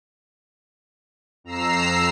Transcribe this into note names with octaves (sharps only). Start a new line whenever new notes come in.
F2 A#5 E6 C7